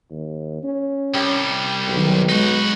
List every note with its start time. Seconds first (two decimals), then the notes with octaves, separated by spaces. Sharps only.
0.10 D#2
0.63 C#4
1.14 C2 G3
1.88 B1 D#3 F#3
2.29 F#3 G#3 D#4 F#4